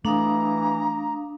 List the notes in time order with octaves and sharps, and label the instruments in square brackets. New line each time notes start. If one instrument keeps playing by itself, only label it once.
[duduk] E3 [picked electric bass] A3 [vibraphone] D4 F5 D#6 [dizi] A#5